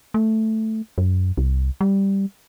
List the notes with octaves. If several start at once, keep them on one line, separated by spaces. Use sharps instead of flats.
A3
F#2
C2
G3